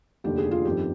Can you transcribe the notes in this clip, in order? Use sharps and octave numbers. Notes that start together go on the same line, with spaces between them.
F1 D#2 D3 G4
G#4
F4
G1 F2 D#3 G4